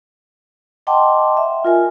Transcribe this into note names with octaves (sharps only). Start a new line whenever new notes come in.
D#5 F#5 G5 A5 C6 D6
E5
F4 A#4 G#5